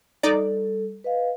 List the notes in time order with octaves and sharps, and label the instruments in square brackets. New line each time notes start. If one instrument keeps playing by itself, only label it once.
[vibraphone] G3 A4 [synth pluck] D#4 D5
[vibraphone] B4 D#5 F5